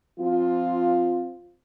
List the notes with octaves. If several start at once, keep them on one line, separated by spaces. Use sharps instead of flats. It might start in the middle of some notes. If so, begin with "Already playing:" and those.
F3 C4 F4